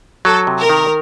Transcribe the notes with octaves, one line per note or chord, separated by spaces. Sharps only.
F#3 A4
C3
A#4
D#3